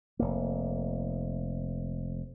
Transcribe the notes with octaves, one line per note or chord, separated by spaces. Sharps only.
F1 A#3